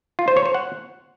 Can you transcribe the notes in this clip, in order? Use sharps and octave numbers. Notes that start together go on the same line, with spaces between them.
F4
C5
C#5
C5
F#5